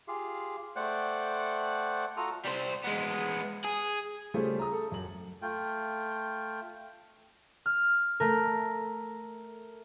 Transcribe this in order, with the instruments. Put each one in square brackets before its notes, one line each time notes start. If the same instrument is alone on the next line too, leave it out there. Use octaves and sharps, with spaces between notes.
[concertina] F4 G4 G#4 F5
A3 C5 D5 F#5 G5 F#6
F4 F#4 A4 A#5 D#6 F6
[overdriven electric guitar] G3 C5
G#3 B3
G#4
[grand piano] C#3 G3 A3 F4 G#4 C5
A#5 D#6
A4
F#2 F#7
[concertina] A3 F4 G5
[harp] F6
A3 A#4